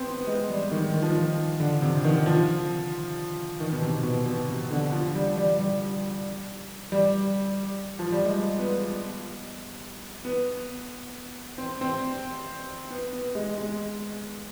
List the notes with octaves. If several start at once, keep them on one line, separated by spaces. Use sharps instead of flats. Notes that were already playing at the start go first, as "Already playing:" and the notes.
Already playing: B3 C4
B3
B3
G#3
G3
D#3
D#3
F3
D#3
D3
C3
D#3
F3
D#3
B2
C3
B2
B2
C3
D3
F3
G3
G3
G3
G3
F3
G3
G#3
B3
B3
C4
C4
B3
B3
G#3
G#3